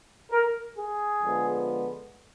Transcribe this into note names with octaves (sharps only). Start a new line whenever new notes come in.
A#4
G#4
D3 F3 G#3 B3